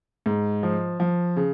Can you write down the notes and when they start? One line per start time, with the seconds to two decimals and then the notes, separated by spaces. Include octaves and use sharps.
0.26 G#2
0.63 F3
1.00 F3
1.36 C#3